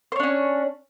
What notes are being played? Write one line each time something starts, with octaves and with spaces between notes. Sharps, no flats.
C#4 D4 C5 C#5